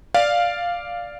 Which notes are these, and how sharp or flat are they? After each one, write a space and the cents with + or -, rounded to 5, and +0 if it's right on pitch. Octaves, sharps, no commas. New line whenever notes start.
D5 +0 F5 +0